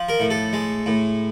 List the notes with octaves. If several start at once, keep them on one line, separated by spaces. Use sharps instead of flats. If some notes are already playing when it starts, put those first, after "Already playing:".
Already playing: F3
A#4
A2
A4
G#3
A2